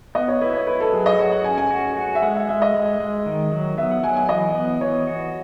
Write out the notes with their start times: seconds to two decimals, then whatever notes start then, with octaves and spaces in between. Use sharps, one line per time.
0.15 B3 D#5
0.28 C#5
0.41 E4 B4
0.54 C#5
0.67 E4 B4
0.80 A4
0.93 F#3 G#4
1.06 D#5
1.19 F#4 C#5
1.32 F#5
1.44 C#4 G#5
1.58 G#5
1.71 F#4
1.97 F#4
2.15 E5
2.22 G#3 F#5
2.36 E5
2.49 G#3 E5
2.62 D#5
2.75 G#3
3.00 G#3
3.26 D#3
3.52 F#3
3.77 B3 E5
3.91 F#5
4.03 F#3 G#5
4.17 G#5
4.29 E3 D#5
4.55 B3
4.81 E3 C#5
5.07 F#4